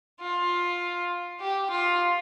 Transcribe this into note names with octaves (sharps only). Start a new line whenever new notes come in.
F4
G4
F4